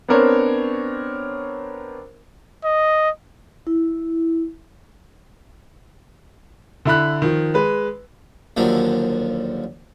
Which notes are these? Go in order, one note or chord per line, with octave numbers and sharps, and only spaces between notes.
B3 C4 D4 A#4 C5 C#5
D#5
E4
D3 E4 B5 F#6
D#3 F3
G#3 B4
D#2 D3 F3 F#3